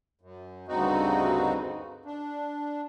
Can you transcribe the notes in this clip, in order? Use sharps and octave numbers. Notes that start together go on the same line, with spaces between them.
F#2
D2 G2 C#3 C4 D#4 F#4
D4